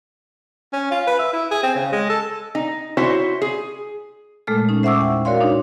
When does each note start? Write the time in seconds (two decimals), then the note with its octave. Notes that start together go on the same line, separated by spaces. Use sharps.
0.73 C#4
0.91 F4
1.07 B4
1.19 E5
1.33 E4
1.51 G#4
1.63 C4
1.75 C#3
1.92 G#3
2.09 A4
2.55 D#4
2.97 E4 F#4 C5 C#5
3.42 G#4
4.47 A#2 G#3 A3 A4 F6
4.69 C#4 D#4
4.83 C5 E5 F#5 C#6 D6 E6
4.99 E2 G5
5.25 F#4 A#4 C#5 D5 F5 C6
5.41 D4 D#4